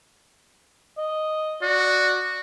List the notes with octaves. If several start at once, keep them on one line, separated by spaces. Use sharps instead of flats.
D#5
F#4 D5